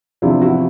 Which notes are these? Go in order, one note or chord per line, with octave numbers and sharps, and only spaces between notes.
E2 C3 F3 D4 E4
E4 F#4